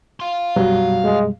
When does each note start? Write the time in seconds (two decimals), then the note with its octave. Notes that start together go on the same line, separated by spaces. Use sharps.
0.20 F5 C6
0.56 F#2 B2 F#3 G3
1.04 G#3